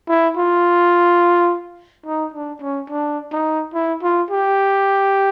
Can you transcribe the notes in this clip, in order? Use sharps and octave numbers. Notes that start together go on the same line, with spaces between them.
E4
F4
D#4
D4
C#4
D4
D#4
E4
F4
G4